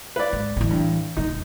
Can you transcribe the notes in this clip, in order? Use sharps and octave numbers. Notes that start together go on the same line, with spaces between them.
B4 D5
G#2
A2 E3
G2
D#1 G2 D#4